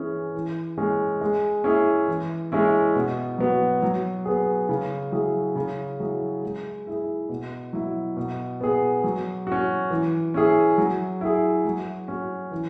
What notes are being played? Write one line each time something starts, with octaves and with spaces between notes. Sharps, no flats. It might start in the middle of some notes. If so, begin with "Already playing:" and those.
Already playing: E3 C#4 E4 G#4
E3
G#3 C#4
G#3
C#4 E4 G#4
E3
G#3 C#4 E4
B2
F#3 B3 F#4
F#3
B3 G#4
C#3
F#3 E4 G#4
C#3
F#3 E4 G#4
G#3
E4 G#4
B2
F#3 E4
B2
B3 G#4
F#3
C#4 F#4
E3
C#4 E4 G#4
F#3
E4 G#4
F#3
C#4 F#4
E3